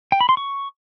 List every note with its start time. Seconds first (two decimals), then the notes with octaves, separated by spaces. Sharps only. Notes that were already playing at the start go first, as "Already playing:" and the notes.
0.12 G5
0.21 B5
0.29 C6
0.37 C#6